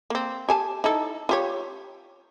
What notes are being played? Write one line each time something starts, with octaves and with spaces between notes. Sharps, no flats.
A#3 C4
G4 G#5 A5
D#4 E4 A4
F4 G4 C#5